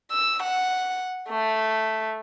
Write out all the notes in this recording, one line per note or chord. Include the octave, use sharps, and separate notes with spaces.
E6
F#5
A3